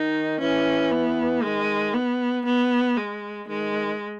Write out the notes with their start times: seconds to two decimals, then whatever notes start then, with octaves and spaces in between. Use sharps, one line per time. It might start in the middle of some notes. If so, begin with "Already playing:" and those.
Already playing: D#3 D#4
0.40 E3 C#4
0.91 B3
1.43 D#3 G#3
1.94 B3
2.45 B3
2.97 G#3
3.48 D#3 G#3